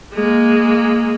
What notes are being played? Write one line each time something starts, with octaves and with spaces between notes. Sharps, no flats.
G#3 A#3